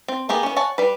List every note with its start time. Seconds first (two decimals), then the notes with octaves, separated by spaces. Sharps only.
0.08 C4
0.29 A#3 B3 G4 G#4
0.43 B3 C#4
0.56 C#5 F#5 G#5 A5
0.78 G3 B4